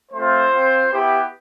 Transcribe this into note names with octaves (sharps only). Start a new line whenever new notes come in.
A3 C4 F4 C5
C4 F4
B3 E4 G4